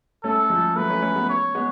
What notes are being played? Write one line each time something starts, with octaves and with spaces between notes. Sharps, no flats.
A3 C#4 A4
F3 G#3
F#3 A3 B4
A3 C#4
A3 C#4
G#3 B3
C#5
G#3 B3